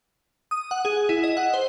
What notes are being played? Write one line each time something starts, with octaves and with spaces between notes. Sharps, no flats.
D#6
F#5
G#4
E4
D#5
F#5
C5